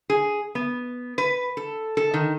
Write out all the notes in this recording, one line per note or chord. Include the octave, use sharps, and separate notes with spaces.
G#4
B3
B4
A4
A4
D#3